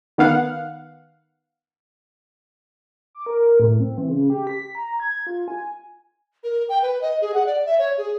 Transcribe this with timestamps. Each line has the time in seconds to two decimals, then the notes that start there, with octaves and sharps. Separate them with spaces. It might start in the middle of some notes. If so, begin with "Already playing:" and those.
0.18 D#3 B3 F5 F#5
3.15 D6
3.26 A#4
3.60 A2
3.80 C4
3.98 E3
4.09 C#3
4.30 G4
4.47 B6
4.75 A#5
5.00 G#6
5.27 F4
5.48 G#5
6.43 A#4
6.69 G5
6.83 B4
7.01 D#5
7.21 G#4
7.34 F#5
7.46 D5
7.66 E5
7.78 C#5
7.98 G#4